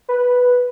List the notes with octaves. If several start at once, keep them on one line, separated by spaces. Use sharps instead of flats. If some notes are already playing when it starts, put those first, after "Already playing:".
B4